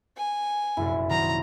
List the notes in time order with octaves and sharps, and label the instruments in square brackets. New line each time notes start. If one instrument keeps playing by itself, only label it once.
[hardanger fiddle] G#5
[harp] F1 A#1 F#2 [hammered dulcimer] E4
[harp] D#3 F#3 C4 [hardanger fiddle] A#5